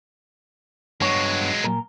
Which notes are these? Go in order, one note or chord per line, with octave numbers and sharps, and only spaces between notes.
G2 F#3 G#3 B3 C#5
A#2 A#4